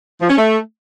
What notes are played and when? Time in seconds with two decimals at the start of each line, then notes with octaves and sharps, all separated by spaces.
0.21 F3
0.29 C#4
0.37 A3